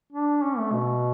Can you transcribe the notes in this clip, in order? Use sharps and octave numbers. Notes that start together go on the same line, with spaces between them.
D4
C#4
A3
B2